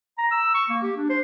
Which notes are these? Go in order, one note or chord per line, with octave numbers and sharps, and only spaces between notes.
A#5
E6
C#6
A#3
G4
D4
C5